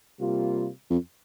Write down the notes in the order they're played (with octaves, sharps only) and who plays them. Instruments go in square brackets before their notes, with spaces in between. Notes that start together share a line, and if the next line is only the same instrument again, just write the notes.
[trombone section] C3 G3 A#3 F4
[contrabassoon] F2